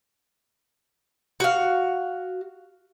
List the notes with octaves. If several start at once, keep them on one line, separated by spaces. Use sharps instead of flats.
F#4 F5